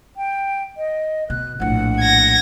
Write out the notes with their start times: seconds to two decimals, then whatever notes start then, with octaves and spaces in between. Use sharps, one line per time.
0.17 G5
0.77 D#5
1.30 B2 F#6
1.60 A#1 A2 F#5
2.00 G#6 A#6